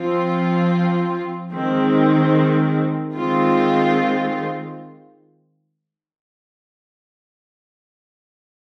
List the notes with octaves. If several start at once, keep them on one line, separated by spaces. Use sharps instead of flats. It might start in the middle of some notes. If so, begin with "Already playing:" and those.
Already playing: F3 C4 F4
D#3 G#3 C4
D#3 G#3 C4 F4